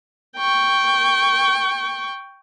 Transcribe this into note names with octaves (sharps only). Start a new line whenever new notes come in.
G5 C#6